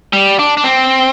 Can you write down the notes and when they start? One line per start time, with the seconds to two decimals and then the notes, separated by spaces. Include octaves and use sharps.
0.13 G3
0.39 D4
0.57 D4
0.64 C4